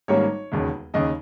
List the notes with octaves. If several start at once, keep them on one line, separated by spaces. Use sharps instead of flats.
G#1 G#2 G3 A#3 C#4 C#5
E1 D#2 C#3
D#2 C#3 D#5